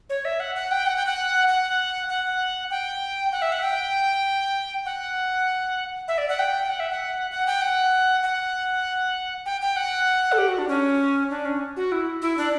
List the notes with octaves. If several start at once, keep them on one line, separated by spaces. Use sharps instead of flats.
C#5
E5
F#5
F#5
G5
F#5
G5
F#5
F#5
F#5
G5
F#5
E5
F#5
G5
F#5
E5
D5
F#5
G5
F#5
E5
F#5
F#5
G5
F#5
F#5
G5
G5
F#5
A4
G4
F#4
D4
C#4
D4
C#4
F#4
E4
E4
D4